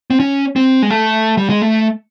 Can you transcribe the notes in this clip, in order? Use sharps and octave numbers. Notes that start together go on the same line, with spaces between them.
C4
C#4
C4
G#3
A3
G3
G#3
A3